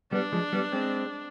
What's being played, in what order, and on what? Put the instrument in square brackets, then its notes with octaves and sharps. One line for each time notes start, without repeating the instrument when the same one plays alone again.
[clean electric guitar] G3 B3 [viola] D4
[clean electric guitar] F3 G#3
G3 B3
G#3 C4